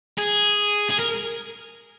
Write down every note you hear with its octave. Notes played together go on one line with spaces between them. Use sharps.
G#4
G#4
A#4